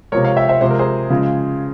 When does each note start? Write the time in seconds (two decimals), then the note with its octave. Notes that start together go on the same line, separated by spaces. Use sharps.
0.12 C3 F3 G#3 A#4 C#5
0.25 C#5 F5
0.36 E5 G5
0.49 C5 E5
0.61 C3 F3 G#3 C5
0.71 A#4
0.79 G#4 C5
1.10 C#3 F3 G#3